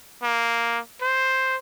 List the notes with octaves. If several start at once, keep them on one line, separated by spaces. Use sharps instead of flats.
A#3
C5